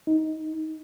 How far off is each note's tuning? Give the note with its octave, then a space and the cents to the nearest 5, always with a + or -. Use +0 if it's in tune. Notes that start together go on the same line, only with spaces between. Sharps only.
D#4 +15